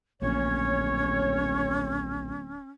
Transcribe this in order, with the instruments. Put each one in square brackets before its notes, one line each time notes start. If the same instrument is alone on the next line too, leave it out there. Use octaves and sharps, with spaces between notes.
[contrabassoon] D1 [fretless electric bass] A#1 A#2 [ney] C#4 [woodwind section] C#5